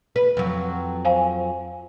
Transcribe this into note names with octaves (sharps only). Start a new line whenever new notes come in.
B4
F2 F#3
C5 F5 G#5